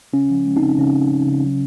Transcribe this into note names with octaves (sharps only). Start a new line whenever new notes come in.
C#3 C#4
F3
G#3
C4 D#4
C#3
C#3 C#4
C#3
C#3
C#3
F#3